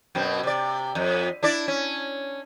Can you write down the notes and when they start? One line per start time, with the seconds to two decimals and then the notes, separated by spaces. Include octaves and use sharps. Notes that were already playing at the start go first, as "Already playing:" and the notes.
0.15 F#2 B2 C4
0.43 C3 D5
0.95 F2
1.43 D4 E4 D5
1.68 C#4